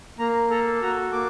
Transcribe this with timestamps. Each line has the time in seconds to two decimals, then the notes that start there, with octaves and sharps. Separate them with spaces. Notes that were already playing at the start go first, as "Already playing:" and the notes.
0.19 A#3 A#5
0.50 A4 A#5
0.82 F#4 A#5
1.13 A#3 D6